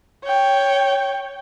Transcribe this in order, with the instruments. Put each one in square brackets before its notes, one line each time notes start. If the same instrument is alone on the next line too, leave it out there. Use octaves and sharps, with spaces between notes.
[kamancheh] C#5 G5